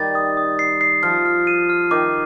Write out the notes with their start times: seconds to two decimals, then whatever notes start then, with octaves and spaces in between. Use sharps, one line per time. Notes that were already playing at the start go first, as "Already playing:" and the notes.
Already playing: D#3 G3 A6
0.15 D#6
0.37 D#6
0.59 C7
0.81 C7
1.03 F3 F6
1.25 F6
1.47 D#7
1.69 F6
1.91 D#3 D6